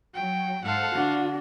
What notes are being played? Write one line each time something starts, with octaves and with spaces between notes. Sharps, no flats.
F#3 G5
G#2 A4 C5 F5 F#5
D3 D4 F#4